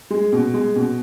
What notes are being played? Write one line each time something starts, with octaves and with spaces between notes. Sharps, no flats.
G#3
B2
G#3
B2